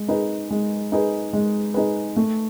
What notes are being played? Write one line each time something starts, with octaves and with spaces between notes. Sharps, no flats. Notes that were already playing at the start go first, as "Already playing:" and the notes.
Already playing: G#3
D#4 G#4 B4
G#3
D#4 G#4 B4
G#3
D#4 G#4 B4
A3